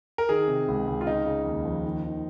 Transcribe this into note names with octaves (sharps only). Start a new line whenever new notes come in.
A#4
D#3 G#4
C3
C#2
C#2
F4
C#3 D#4
C#3
D#2
F3
D#3
D#3